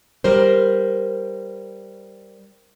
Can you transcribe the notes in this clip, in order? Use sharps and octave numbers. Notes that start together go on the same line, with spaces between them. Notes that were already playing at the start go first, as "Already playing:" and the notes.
G3 A#4 C5